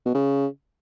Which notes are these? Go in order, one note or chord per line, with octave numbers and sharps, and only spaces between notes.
B2
C#3